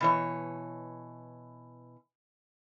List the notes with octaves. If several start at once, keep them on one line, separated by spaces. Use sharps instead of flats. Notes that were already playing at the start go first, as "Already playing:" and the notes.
B2 E3 C#5